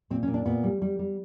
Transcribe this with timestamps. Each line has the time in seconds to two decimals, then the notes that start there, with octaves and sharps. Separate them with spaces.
0.10 A#2 C4
0.23 C#4
0.28 A#2
0.34 D4
0.46 A#2 B3
0.63 G3
0.82 G3
0.99 G3